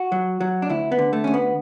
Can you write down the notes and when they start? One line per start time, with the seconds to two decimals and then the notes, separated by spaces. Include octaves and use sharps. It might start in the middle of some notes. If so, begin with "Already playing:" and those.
Already playing: F#4
0.12 F#3
0.40 F#3
0.62 D4
0.69 D2 E4
0.92 B3
0.98 D3
1.13 A3
1.24 D2 C#4
1.34 B3